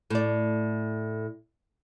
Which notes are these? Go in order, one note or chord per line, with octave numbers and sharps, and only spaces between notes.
A2 D5